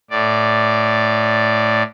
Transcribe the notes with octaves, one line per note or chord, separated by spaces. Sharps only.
A2 D5